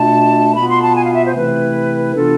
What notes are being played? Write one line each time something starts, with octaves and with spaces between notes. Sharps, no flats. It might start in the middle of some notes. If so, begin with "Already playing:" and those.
Already playing: B2 A3 D4 F4 A5
B2 B3 F4 B5
C6
A5
G#5
F5
E5
C5
C3 E3 A3 C4 E4 B4
C3 E3 B3 D4 F4 A4